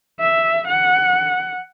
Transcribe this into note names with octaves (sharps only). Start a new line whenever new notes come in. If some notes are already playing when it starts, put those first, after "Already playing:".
E5
F#5